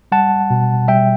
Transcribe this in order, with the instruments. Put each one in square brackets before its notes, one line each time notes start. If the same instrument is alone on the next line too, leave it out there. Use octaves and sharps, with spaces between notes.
[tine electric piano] G3 F#5 A5
B2
G3 E5 G5